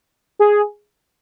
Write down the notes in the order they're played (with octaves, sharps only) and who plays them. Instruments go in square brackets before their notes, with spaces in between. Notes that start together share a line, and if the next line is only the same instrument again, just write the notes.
[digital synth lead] G#4